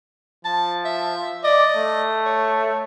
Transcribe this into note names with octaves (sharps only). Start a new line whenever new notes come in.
F3 A5
E5
D5 D#5
A3
C#5